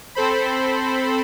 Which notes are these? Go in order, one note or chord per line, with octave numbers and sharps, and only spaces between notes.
C4 A4 C5 B5